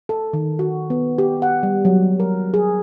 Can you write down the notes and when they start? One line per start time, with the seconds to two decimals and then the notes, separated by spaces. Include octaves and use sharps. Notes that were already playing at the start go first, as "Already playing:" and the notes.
0.09 A4
0.33 D#3
0.59 F#4
0.90 B3
1.18 G4
1.42 F#5
1.63 G3
1.85 F#3
2.20 A#4
2.54 G#4